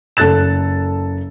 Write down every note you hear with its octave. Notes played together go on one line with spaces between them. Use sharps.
F#1 A4 F#6 A6 E7